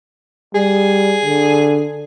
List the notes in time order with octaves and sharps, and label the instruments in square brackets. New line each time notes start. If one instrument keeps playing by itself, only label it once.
[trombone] G3 [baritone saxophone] G#4
[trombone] D3